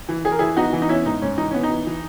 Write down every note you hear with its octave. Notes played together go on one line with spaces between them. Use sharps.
E3
E3 G#4
A#4
E3 E4 G#4
B3 D#4 F#4
E3
D#4
B3 C#4 E4
G#2 D#4
G#2 C#4
E3 D#4
B3 C#4
D#4
E3
E3